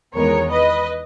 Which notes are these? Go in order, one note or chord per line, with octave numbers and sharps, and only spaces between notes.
E2 D#3 G#3 B3 A#4 C#5
B4 D#5